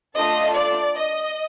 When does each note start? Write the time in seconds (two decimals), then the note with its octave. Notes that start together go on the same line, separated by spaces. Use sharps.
0.16 A3 D4 F4 A4 D#5
0.56 D5
0.96 D#5